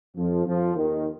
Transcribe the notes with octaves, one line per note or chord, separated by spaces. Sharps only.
F2 F3
F2 F3
D#2 D#3